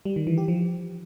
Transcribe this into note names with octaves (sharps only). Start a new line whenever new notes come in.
G3
D#3
E3
G4
F3